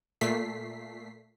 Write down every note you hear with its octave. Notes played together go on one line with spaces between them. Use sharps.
A#2 A3 B6 C7